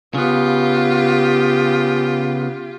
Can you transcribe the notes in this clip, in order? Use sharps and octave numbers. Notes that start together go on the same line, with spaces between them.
C#3 B3 F4 G4